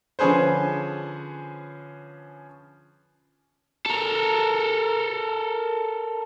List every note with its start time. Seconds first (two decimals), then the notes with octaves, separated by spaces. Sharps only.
0.19 D3 F3 C#4 G#4 B4 C5
3.86 A4 A#4